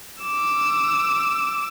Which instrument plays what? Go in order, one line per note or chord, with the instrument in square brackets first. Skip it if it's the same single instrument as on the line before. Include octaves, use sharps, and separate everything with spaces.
[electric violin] D6 E6